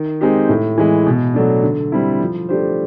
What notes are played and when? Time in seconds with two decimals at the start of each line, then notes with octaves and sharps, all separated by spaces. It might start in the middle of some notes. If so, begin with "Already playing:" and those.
Already playing: D#3
0.21 G#3 C4 D#4 G4
0.49 A2
0.78 E3 G#3
1.06 B2
1.34 F#3 A3 D4
1.64 D3
1.92 G3 C4 E4 A4
2.21 F3
2.49 A3 D4 G4 C5